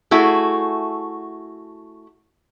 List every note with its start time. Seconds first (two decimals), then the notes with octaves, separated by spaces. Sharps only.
0.11 A3 E4 F#4 G#4